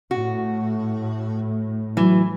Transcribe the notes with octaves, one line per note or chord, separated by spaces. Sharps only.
A2 F#4
E3 F#3